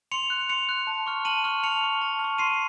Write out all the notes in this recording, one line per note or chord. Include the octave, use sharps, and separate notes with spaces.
C6 C#7 F7
F#6
C6 C#7 F7
F#6
A5
C#6 F6
A5 D#7 F#7
C#6 F6
A5 C#7 F7
C#6 F6
A5
F6
C#6
C6 C7 D#7